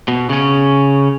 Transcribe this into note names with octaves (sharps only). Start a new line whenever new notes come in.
B2
C#3 C#4